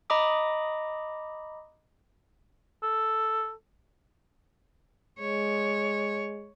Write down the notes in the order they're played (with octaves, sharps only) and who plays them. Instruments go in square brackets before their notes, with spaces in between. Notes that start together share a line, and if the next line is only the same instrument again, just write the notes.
[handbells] D#5 A#5 B5 D6 D#6
[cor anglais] A4
[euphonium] G#3 [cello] C#5